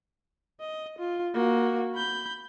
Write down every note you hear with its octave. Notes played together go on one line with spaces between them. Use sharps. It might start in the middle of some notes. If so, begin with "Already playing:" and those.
D#5
F4
A#3 F#4
B5 G6